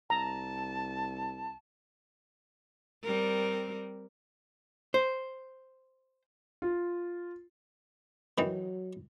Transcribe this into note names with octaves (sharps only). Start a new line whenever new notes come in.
C2 A5 A#5
G3 C4 A#4
C5
F4
D#3 E3 F#3 D#4